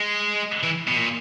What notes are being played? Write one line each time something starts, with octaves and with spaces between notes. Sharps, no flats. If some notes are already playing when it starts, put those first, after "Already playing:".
Already playing: G#3
E3
B2
A#2